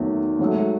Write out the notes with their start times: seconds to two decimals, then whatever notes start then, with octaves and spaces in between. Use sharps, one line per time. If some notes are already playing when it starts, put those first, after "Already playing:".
Already playing: E2 D#3 F#3 A3
0.39 G#2 F#3 A3